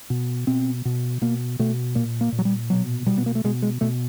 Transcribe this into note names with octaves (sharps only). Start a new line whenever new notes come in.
B2
B2 C4
B2
B2 A#3
B2 A3
A#2 A#3
A#3
A#2
F#3
G3
B2 F#3
B2 G3
B3
A#3
A3
B2 G#3
G#3
B2 A3